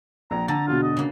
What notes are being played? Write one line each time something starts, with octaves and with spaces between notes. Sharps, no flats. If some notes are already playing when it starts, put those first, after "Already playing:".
A#1 A#5
D3 A5 A#5 A6
E1 B2 F4
D#5
C#3 A#3